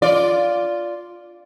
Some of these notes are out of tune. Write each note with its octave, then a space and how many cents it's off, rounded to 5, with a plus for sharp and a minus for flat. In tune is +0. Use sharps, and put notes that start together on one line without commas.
F4 +0 D5 -10